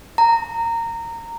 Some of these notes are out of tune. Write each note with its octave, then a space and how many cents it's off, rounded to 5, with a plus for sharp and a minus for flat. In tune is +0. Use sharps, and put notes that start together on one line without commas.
A#5 -20